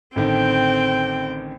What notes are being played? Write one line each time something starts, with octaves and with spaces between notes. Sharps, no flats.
A1 D3 D#3 C4 G5